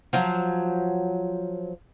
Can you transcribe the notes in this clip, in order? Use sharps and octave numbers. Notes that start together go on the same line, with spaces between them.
F3 F#3